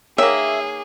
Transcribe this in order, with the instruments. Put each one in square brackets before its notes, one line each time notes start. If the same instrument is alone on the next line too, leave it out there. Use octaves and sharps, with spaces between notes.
[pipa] D#3 A#3 [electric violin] G#4 [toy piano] C#5 F5 [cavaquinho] E5